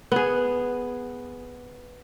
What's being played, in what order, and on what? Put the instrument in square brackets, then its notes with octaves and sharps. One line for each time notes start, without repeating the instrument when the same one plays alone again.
[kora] B3 G#4